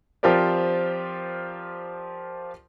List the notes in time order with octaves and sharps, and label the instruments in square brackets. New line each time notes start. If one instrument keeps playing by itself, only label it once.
[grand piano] F3 C4 F4 G4 A#4 D5